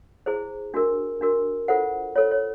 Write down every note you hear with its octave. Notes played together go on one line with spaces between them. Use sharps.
E4 G#4 C5
D4 F#4 A#4
D4 F#4 A#4
F4 A4 C5 F#5
F4 A4 C5 C#5
C#5